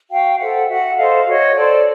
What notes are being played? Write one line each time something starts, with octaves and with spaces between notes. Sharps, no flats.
F#4 F5 G5
A4 C5 E5 F#5
F#4 E5 F#5
A4 C5 D#5 F5
F#4 C#5 D#5
A4 C5 D5